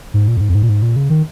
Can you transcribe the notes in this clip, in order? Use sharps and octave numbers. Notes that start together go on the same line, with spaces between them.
G#2
A#2
F2
G#2
F2
G#2
A#2
G#2
A#2
C#3
D#3